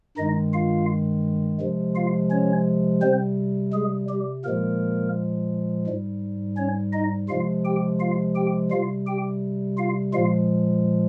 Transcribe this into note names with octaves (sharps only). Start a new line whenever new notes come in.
G2 D#3 G#3 D#4 D#5
F4 F5
C3 F3 G#3
F4 F5
C#4 C#5
C3 G3 C4 C5
G#3 G#4
G3 G4
A#2 F3 G#3 A#3 A#4
G#2 G3
C#4 C#5
D#4 D#5
C3 F3 G#3 F4 F5
G4 G5
F4 F5
G4 G5
C3 G3 F4 F5
G4 G5
F4 F5
A#2 F3 G#3 F4 F5